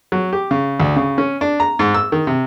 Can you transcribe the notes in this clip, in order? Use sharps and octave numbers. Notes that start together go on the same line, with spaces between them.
F#3
G4
C#3
D2
C#3
C#4
D4
A#5
G#2
E6
D#3
C3